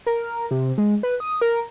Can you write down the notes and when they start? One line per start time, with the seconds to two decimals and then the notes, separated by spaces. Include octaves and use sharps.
0.06 A#4
0.51 C3
0.78 G#3
1.03 B4
1.20 D#6
1.41 A#4